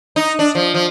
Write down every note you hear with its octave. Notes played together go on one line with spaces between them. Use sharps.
D#4
D4
F3
F3